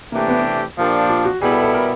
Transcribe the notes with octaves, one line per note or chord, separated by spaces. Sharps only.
C3 E3 A3 A#3 D4 G4
B3
A#2 F3 A#3 D4 G4
F4
F#4
B2 G3 B3 E4 G#4
A4
A4
A#4